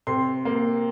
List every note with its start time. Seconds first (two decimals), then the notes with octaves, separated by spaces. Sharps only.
0.07 C3 C6
0.45 A#3